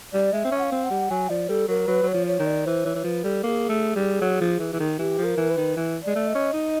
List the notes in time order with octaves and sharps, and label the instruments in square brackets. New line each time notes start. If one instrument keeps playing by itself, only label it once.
[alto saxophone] G3 [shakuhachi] D5
[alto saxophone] G#3 [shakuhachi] E5
[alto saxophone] C4
C#4
[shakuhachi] F#5
F5
[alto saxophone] C4
[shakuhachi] F#5
[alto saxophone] G3
[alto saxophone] F#3 [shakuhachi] G#5
[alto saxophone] F3 [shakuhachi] D5
[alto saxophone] G3 [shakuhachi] A4
[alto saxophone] F#3 [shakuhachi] A#4
[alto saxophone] F#3 [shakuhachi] B4
[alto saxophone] F#3 [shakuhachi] C#5
[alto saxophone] F3
[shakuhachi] C#5
[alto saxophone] D#3
[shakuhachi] D5
[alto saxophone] E3 [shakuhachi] C5
[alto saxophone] E3 [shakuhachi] C#5
[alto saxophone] E3
[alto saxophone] F3 [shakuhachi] B4
[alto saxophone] G3 [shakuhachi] A4
[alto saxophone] A#3 [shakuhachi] A4
[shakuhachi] G#4
[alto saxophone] A3
G3
F#3
F3
E3
E3
D#3
[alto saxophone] E3 [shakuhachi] G4
[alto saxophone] F3
[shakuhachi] A#4
[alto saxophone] E3
[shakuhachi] B4
[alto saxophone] D#3
E3
[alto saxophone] G#3 [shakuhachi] D5
[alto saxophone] A3
[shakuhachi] D#5
[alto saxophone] C#4
D#4